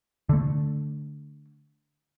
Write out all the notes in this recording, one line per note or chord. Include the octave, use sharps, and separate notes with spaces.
D3 A3